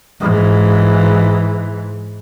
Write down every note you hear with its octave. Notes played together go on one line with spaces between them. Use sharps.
G#2 E3